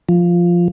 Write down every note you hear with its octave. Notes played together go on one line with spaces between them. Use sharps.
F3